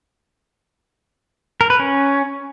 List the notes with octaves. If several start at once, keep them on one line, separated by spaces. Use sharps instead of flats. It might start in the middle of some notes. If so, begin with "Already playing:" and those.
A#4
B4
C#4